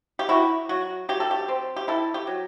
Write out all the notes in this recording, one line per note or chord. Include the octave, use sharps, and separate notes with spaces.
G4
E4 F#4
F#3 F#4
F#3 G4
A4
G4
C4
G4
E4 A4
G4
F#3